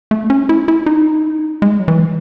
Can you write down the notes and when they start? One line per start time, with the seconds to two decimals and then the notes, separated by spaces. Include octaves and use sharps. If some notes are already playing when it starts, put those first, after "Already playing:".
0.11 A3
0.30 C#4
0.49 E4
0.68 E4
0.86 D#4
1.62 G#3
1.80 F#3
1.88 E3